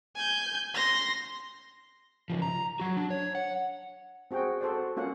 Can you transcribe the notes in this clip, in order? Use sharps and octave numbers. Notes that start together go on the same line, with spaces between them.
G#5 G6
C6 A#6
C#3 F3
A#5
F#3 F#4
D4
C#5
F#5
C4 F#4 G#4 G5
F#4 A4 C5 D5
A#3 C#4 F4 F#5